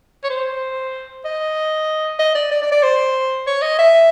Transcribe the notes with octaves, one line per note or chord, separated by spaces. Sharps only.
C#5
C5
D#5
D#5
D5
D5
D5
D5
C5
C#5
D#5
E5